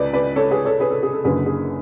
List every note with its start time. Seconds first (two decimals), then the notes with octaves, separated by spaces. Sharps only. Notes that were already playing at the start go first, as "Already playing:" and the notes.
Already playing: C#2 C#3 B4 D5
0.14 B4 D5
0.36 A4 C#5
0.51 G#4 B4
0.65 A4 C#5
0.80 G#4 B4
0.91 A4
1.03 G#4
1.13 A4
1.24 F#1 F#2 D3 G#4 B4
1.46 G#4